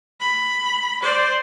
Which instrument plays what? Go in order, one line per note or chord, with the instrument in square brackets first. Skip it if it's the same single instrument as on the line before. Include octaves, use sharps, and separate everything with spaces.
[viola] B5
C5 D5